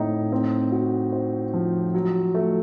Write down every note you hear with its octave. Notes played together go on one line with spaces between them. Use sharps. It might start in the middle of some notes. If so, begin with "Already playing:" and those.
Already playing: A2 C4 D#4
C4
F#4
C5
F3
F#3
A3